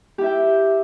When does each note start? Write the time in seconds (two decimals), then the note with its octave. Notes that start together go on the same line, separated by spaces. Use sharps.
0.18 G4
0.21 E4
0.23 E5
0.26 G5